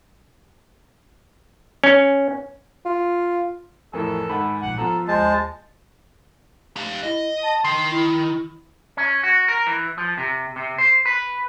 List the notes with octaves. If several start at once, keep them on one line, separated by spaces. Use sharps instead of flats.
C#4
F4
F2 A2 E3 A4 A#4 G#5
G#2 D#3 F#5 G#5 B5
A#1 A#2 F#5
F3 B3 F4 A4 A#5
A#1 D#2 G#3 C5 A5
G4 F5
E4 D#5
A5
D#3 C6
E4
C#4
F#4
A#4
E3
F3
C3
C3
C5
B4